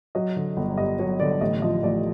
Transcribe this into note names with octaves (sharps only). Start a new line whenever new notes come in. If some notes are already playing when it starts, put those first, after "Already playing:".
F#3 D#5
D3
G1
G2 D#5
F#3 C#5
D3 D5
A1 D#5
F3 D#5
A1 D5